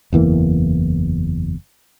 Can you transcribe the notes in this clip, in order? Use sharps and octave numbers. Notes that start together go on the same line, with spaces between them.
F#1 E2 E3 A#3